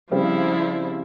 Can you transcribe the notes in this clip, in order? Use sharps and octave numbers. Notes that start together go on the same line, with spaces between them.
C#3 F3 G3 C4 E4